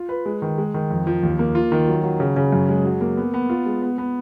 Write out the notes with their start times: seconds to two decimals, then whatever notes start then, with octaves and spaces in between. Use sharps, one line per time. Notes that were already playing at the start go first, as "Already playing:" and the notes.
Already playing: F4
0.09 B4
0.26 G#3
0.42 D#3
0.58 G#3
0.74 D#3
0.91 F2
1.07 F3
1.23 D#2
1.39 A#3
1.55 F4
1.72 D#3
1.88 F#3
2.03 F#3
2.20 C#3
2.36 C#3
2.52 F#2
2.69 G#3
2.85 F#3
3.01 A#3
3.17 B3
3.34 B3
3.49 F4
3.66 G#3
3.82 B3
3.98 B3